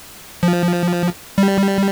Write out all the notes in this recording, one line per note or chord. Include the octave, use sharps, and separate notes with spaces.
F3
G3